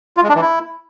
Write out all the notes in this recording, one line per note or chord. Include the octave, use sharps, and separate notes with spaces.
F4
G#3
D4
E3
E4